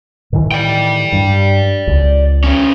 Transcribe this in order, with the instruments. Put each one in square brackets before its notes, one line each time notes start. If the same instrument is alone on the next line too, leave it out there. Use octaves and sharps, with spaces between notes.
[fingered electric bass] A2 D#3 E3
[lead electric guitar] D5 G5
[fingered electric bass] G2
C#2
[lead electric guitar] B2 C#4